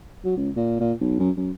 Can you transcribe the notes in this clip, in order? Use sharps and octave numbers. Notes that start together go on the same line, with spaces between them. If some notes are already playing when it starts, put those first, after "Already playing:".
F#3
C#2
A#2
A#2
B1
F#2
F#2